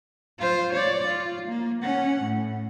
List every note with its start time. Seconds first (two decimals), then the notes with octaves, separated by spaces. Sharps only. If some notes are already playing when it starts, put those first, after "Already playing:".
0.39 F4 C5
0.73 C#5 D5
1.07 F4
1.48 A#3
1.82 C#4 F#5
2.22 A2